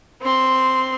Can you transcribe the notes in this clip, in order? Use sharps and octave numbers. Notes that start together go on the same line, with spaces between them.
C4 C6